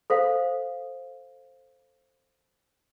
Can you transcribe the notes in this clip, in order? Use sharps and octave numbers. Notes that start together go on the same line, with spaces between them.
A4 C5 F5